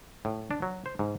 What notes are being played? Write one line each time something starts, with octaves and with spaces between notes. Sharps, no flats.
A2
D4
F#3
C5
G#2